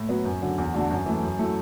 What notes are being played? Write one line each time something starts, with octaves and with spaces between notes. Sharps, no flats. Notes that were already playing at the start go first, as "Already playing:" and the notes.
Already playing: A2
F#3 B3
F#2
D3 F#3
E2
D3 A3 D4 F#4
F#2
E3 A3
F#2
F#3 A3 E4